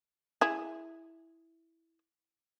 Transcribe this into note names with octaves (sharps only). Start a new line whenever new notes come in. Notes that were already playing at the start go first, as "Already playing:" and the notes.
E4 G#4